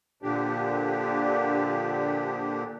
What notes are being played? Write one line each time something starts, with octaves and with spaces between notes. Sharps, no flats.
A#2 D3 F3 D4 G4